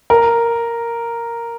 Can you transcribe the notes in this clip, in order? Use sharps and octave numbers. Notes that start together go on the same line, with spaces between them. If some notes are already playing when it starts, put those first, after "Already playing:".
A#4